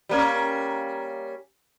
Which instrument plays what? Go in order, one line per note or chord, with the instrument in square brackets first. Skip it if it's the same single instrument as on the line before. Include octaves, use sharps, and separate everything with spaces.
[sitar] G3 A#3 C#4